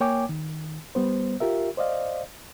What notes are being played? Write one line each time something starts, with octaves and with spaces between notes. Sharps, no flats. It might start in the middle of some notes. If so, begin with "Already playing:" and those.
A#3 C#5 G5 G#5 D6
D#3
G3 B3 C5
F4 G4 A#4 E5
C5 D5 D#5 F5